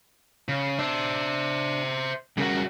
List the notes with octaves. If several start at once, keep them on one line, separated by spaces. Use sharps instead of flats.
C#3
D4 C5 E5
C#3 G3 C#4 F#4 A#4